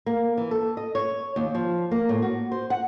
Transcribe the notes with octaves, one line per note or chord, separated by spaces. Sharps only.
A#3
E3
A4
D#5
C#5
D#2
F3
A#3
A2
F#4
C5
F#5